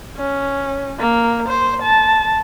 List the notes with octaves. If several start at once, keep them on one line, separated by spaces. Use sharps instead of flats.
C#4
A#3
C5
A5